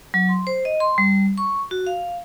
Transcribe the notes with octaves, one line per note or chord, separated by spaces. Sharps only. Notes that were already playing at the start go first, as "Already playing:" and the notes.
F#3
C6
C5
D#5
C6
G3
C#6
F#4
F5